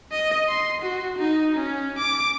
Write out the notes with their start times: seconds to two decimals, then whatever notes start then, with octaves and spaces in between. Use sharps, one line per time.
0.12 D#5
0.49 C6
0.82 F#4
1.18 D#4
1.57 C#4
1.99 D6